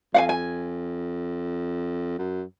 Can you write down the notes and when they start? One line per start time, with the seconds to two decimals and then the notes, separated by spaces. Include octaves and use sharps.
0.14 F2 F5 F#5 G#5
0.29 G#5
2.19 F#2